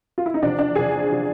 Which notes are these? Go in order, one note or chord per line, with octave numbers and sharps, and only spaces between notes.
F4
E4
D#4
E2 C3 F3 D4
D4
E2 C3 F3 G#4
C3 F3